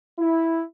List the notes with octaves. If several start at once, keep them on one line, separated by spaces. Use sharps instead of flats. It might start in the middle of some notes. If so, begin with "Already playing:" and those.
E4